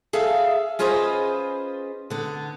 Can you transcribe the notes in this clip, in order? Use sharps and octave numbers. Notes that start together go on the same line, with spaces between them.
G#4 A4 E5 F5
C#4 F4 G#4 B4 C5 D#5
D3 B3